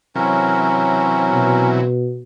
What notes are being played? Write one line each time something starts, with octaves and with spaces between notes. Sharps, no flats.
C3 E3 F#3 C#4 A#4
B2